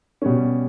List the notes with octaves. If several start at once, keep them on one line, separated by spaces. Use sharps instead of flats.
B2 G3 C#4